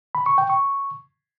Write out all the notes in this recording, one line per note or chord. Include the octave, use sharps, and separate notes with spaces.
B5
C#6
G5
C#6